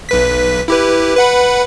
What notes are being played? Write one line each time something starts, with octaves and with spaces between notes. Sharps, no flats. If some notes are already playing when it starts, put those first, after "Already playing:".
B1 B4 B6
E4 G4 B4
B4 F#5 B5